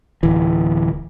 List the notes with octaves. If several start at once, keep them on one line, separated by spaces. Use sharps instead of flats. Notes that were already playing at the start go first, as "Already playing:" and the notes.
D1 E3